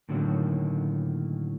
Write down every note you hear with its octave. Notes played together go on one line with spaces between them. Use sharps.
A2 D3 D#3 F#3 A#3